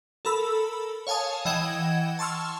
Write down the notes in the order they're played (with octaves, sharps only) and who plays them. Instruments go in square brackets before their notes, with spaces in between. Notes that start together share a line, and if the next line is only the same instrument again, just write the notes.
[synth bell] A4 A#4 B5 E6
C#5 F5 G#5 A5 D#6
E3 D#5 F#5 G5 G#6 E7
A5 C6 C#6 E6 F6